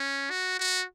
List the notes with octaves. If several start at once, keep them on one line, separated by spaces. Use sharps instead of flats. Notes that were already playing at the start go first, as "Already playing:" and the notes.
Already playing: C#4
F#4
F#4